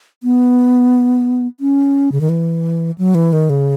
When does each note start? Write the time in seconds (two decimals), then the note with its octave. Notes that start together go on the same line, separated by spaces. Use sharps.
0.23 B3
1.60 C#4
2.12 C#3
2.21 D#3
2.29 E3
2.98 F#3
3.15 E3
3.33 D#3
3.50 C#3